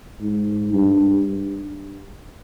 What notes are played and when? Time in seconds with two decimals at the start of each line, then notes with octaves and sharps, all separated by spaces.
0.21 G#2
0.73 G2